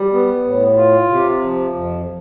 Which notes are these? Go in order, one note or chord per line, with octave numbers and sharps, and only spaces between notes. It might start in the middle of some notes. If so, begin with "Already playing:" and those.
Already playing: G3
B3
A2
F4
C3
F3
F2